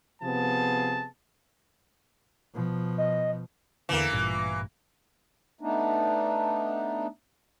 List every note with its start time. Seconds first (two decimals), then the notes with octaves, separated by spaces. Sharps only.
0.22 C3 F3 B3 G#4 A5
2.53 B2 F3
2.98 D#5
3.89 E2 D3 E3 A#3 E7
4.11 A1 G2 A#2
5.61 A3 B3 D4 D#4